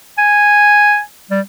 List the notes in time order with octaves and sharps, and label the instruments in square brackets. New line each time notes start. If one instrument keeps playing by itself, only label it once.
[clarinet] G#5
G3